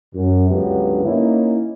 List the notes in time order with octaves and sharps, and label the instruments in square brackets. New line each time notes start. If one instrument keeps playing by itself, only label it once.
[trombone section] F#2
C#2 G2 D3 F#3 G3 B3
A#3 C#4 D#4 E4